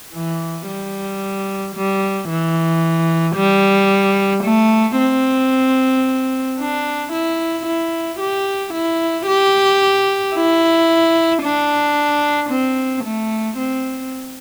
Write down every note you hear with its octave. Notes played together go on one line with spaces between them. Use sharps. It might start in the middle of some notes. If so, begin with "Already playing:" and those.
E3
G3
G3
E3
G3
A3
C4
D4
E4
E4
G4
E4
G4
E4
D4
C4
A3
C4